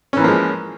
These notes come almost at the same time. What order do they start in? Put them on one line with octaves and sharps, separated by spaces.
C#4 E3 A#3 F3 G#3